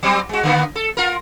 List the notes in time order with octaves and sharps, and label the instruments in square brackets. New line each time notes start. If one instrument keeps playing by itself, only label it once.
[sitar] F#3 G3 C4
G#3 F#4
D3 A#3 B3
A4
F4 A#4